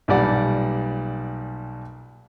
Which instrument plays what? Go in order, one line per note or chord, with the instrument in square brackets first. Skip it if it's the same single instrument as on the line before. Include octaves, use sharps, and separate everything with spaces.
[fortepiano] B1 A#2 G3 D5 F#5